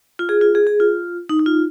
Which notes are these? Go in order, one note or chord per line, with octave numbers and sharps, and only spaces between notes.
F4
G#4
F4
G#4
G#4
F4
D#4
D#4
F4